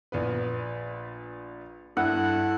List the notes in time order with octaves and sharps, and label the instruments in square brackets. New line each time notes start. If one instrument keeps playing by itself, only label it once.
[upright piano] A#1 B3 B4
[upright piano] G2 [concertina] E4 A4 [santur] F#5